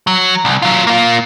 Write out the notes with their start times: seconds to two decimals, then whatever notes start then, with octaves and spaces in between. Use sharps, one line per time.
0.07 F#3
0.45 C2
0.62 F#3 F4
0.87 A#3 F4